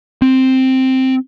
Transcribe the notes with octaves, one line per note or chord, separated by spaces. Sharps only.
C4